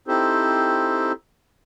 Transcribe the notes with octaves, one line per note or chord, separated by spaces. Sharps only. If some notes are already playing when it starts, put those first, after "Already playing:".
C4 D#4 E4 G4 A4 C5